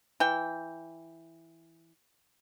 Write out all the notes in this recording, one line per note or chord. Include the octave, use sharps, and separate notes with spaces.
E3 G5